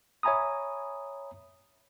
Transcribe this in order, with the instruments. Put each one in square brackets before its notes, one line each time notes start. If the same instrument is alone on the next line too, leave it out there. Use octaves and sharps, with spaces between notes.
[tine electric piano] C#5 E5 G#5 A#5 B5 D#6